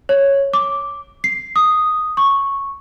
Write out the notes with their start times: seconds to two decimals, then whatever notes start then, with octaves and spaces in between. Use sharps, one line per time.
0.09 C#5
0.53 D6
1.24 C7
1.56 D#6
2.17 C#6